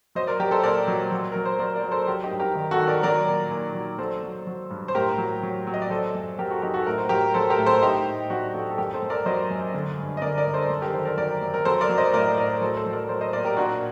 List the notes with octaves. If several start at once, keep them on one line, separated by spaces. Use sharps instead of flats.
F#3 C5 D#5
A#4 D5
F#3 G4 A#4
A4 C5
A#2 A#4 D5
F#3
F#3
F#3 A#4
C5
F#3 A#4 D5
A#4 D5
F#3
A4 C5
F#3 G4 A#4
D#4 G4
G2
G4 A#4
D#3
F#4 A4
D#3
A#4 D5
F#3 A#4 D5
A#2
A#2
F#3
F#3 A4 C5
F#3
F#3
G2
C5
A2 G4 A#4
F#3
F#3
F#3
D#5
D5
F#3 A4 C5
F#2
F#3 G4 A#4
F#4 A4
F#3 D#4 G4
F#4 A4
A2 A#4
C5
F#3 G4 A#4
F#3 A4 C5
G4 A#4
A2
A4 C5
A2 D#4 G4
A2
F#3 D4 F#4
F#3 F#4 A4
A4
F#2 G4 A#4
A4 C5
F#2
A#4 D5
F#3 C5 D#5
F#2
D3
G2
D#5
D3 A#4 D5
A#4 D5
G2
A4 C5
F#2
A4
G4 A#4
D#3 A4 C5
A#4 D5
F#3 A#4 D5
F#2
A#4
F#3 A4 C5
A#4 D5
F#3
C5 D#5
A2 A#4 D5
A2 A#4 D5
F#3 A4 C5
A4 C5
F#3
A#4 D5
A#4
F#3 A4 C5
C5 D#5
A#2 A#4 D5
G4 A#4
A#2 D4 F#4